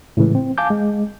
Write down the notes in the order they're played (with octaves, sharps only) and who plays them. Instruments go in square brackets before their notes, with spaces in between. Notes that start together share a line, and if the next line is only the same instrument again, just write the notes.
[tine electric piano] A2 C#3 E3 G#3
C4
F5 G#5 A5 D6 G6
G#3